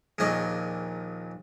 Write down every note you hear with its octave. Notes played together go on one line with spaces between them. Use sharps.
A#1 D#2 A#2 G#4 D#5 C#6